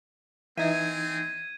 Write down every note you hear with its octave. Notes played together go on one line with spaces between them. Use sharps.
E3 A#3 C4 D#4 E5 G#5 G#6 D#7